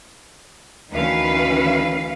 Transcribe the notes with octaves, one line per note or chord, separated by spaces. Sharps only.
D2 D#3 E3 C#4 B4 F5